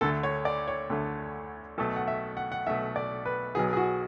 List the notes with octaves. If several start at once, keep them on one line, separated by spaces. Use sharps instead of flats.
D2 D3 A3 A4
C#5
D5
C#5
D2 D3 A3
B1 B2 A3 A4
F#5
E5
F#5
F#5
B1 B2 A3 E5
D5
B4
B1 B2 F#3 B3 G#4
G#4
F#4